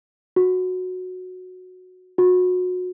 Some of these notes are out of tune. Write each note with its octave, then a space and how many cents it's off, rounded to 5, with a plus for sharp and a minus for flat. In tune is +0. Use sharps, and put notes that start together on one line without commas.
F#4 -10
F#4 -30